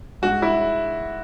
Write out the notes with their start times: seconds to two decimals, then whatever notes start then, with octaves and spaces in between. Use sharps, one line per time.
0.22 G#2 G#3 F#4
0.42 E4